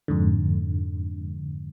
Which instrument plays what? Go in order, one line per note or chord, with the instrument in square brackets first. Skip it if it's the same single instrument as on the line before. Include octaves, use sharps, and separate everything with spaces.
[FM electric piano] F2 G#2 D3